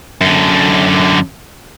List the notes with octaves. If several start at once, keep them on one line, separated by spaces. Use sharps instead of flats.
F#2 D3